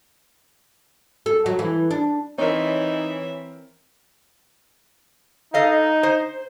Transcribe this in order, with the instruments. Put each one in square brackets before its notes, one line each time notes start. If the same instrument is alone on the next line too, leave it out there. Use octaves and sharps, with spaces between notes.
[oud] A4
F#3
E3
D4
[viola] E3 E5 [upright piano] C4 A#4 [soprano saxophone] D#4 [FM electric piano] C#5
[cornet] D#4 [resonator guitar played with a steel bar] A4 D#5 F5
[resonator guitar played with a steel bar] C5